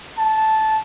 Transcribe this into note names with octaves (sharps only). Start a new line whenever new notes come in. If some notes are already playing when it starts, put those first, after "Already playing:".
A5